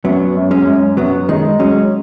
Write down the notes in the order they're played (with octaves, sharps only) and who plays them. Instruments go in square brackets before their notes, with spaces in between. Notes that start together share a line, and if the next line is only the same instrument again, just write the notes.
[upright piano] F#2 [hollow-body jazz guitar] F#3 B3
[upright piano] F#2
[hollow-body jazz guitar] G#3 C#4
[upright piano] F#2
[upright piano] F#2 [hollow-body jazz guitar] F#3 B3
[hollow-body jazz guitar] D#3 G#3 [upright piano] D#4
[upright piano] F#3 [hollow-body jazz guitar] G#3 C#4